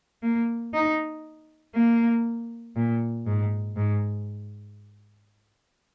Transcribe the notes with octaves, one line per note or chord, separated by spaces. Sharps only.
A#3
D#4
A#3
A#2
G#2
G#2